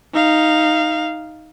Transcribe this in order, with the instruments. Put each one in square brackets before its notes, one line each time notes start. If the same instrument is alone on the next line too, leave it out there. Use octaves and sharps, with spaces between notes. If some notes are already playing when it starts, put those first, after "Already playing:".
[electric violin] D#4 F5